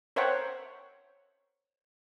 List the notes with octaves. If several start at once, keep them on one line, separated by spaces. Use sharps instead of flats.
A#4 C5 C#5 E5 F#5 G5